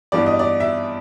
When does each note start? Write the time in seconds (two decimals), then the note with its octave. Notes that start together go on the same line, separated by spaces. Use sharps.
0.12 G2 E3 G3 B3 D5
0.26 D#5
0.39 D5
0.60 E5